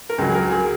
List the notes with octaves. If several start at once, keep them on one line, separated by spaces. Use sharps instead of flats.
A#4
C#2 C#3 F#3 G#4
G#4
A#4
G#4